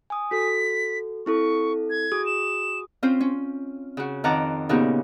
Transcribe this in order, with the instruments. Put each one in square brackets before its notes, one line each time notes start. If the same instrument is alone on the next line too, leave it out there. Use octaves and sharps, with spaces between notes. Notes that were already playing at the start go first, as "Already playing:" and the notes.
[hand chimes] G#5 D#6
[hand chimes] F#4 A4 [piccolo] B6
[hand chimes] C4 E4 A4 [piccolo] C#6
[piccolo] G#6
[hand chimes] F#4 G#4 D#6
[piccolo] E7
[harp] C4 C#4 F4 C5
C#4
C#3 F#4
F2 D#3 F#5 A5 A#5 D6
A#2 C#3 B3 D#4 F#4 G4